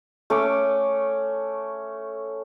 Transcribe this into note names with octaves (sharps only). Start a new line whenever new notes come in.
A3 C#4 C#5 D6